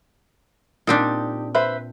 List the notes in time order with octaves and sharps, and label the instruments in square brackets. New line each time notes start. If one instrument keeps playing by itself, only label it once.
[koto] A#2 C4 D4 [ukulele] D#4 G4
[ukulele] B4 C5 E5